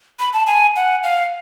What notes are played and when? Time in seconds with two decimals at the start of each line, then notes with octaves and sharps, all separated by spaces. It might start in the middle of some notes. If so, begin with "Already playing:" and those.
0.19 B5
0.33 A5
0.47 G#5
0.76 F#5
1.03 F5